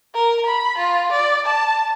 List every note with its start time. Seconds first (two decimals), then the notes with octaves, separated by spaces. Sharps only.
0.15 A#4
0.46 B5
0.78 F4
1.12 D5
1.46 A5